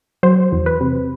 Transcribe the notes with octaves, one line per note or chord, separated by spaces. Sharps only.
F#3 C5
E2
B4
C3